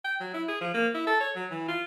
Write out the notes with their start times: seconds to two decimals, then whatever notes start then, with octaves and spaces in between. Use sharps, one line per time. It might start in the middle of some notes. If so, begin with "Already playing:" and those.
0.05 G5
0.20 F#3
0.34 E4
0.48 G#4
0.61 F3
0.74 A#3
0.94 E4
1.07 A4
1.20 C#5
1.36 F#3
1.50 E3
1.68 F4